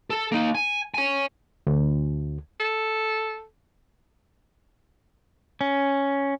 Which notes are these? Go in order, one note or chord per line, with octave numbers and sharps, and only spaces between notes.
A4
A#3 D#4
G#5
C#5 G#5
D2
A4
C#4